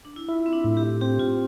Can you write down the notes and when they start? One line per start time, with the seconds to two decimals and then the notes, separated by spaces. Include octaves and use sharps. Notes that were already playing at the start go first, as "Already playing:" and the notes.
0.05 D4
0.16 E4
0.28 E4 F4
0.46 C4
0.53 D4
0.64 A2
0.77 G4
1.01 C4 G4
1.19 F4